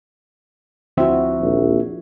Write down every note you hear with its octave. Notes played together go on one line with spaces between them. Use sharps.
D2 F3 C4 E4 F#4 E5
A#1 D#2